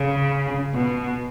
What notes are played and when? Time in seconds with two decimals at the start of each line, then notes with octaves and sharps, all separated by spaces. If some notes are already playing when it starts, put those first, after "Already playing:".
Already playing: C#3
0.75 B2